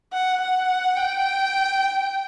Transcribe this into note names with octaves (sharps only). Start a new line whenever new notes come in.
F#5
F#5
G5